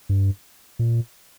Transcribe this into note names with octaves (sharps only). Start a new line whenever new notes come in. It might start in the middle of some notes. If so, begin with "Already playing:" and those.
G2
A#2